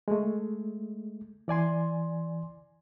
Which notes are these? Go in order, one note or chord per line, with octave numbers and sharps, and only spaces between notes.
G#3 A3
E3 D5 G#5 C6